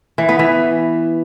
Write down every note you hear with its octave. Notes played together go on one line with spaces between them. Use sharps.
E3
B3
E3